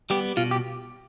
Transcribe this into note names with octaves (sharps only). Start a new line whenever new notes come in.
G3 B3 G4
B2 F4
G4